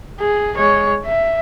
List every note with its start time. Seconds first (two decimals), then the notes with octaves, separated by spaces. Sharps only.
0.20 G#4
0.55 G#3 C#5
1.06 E5